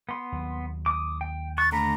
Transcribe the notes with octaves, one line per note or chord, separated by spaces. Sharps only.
B3 C6
D#2 F#3
D6 D#6
G5
C#6 F#6 A6
D3 A3 A#5 B5